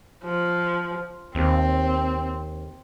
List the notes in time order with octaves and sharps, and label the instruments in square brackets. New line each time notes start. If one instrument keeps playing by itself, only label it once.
[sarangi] F3
[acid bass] D#2 [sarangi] C4